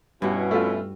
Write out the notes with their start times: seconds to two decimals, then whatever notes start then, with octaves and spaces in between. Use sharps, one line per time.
0.22 G2 B2 C#4 E4 F#4
0.51 A3 F4